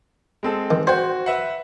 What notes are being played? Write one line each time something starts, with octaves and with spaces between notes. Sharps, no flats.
G#3 C4 A4
D#3
F#4 C5 G5
B4 E5 F#5